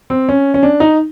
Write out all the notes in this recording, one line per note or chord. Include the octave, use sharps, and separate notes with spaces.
C4
C#4
C#4
D4
D#4